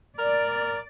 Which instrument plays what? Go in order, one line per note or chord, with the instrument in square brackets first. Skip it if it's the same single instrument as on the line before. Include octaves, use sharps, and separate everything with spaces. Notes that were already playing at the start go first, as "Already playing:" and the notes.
[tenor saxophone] A#4 [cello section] D5